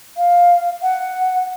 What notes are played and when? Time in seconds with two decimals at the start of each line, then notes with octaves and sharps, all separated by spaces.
0.17 F5
0.83 F#5